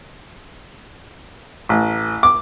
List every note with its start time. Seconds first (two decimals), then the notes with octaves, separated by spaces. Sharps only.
1.69 A1
2.23 D6